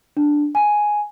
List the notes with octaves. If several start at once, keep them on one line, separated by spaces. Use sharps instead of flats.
D4
G#5